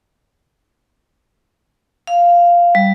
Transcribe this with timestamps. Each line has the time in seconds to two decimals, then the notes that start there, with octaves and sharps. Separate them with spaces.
2.07 F5
2.75 G3